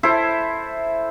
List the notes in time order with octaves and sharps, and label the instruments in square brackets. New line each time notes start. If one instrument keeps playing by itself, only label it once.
[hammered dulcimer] E4 A4 C5 E5